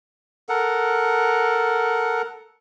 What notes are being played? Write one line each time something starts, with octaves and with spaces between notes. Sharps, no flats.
A4 A#4 F#5